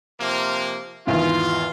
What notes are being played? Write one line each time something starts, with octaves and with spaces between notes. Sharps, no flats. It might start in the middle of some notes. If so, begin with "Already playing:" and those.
C3 F3 A#3
G#1 E2 F4